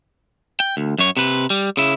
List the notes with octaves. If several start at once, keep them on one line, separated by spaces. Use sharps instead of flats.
G5
D2
F#2 C#5
C3 B4
G3
C#3 E4